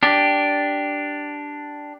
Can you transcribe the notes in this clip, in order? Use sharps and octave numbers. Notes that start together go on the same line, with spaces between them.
D4 G4